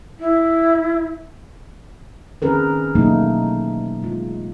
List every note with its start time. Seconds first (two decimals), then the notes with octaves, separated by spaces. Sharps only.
0.19 E4
2.42 D#3 C4 C#4 G#4 A#4 B4
2.95 B2 E3 F#3 A3 A#3 D#4
4.03 G#3 F4